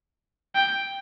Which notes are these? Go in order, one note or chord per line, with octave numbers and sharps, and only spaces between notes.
G5